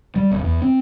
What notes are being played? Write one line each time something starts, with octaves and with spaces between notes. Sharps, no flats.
G3
D1
E2
C4